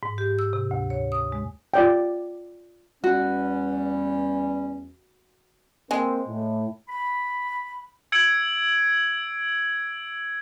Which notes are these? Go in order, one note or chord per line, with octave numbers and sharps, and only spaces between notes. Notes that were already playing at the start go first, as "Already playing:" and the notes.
G#2
G4
E6
C3
D2
C#5
D#6
G#3
F4 D5 G5
E2 G3 C#4 F#4
G#3 A#3 C4
A2
B5
E6 G#6 C#7 D7 F#7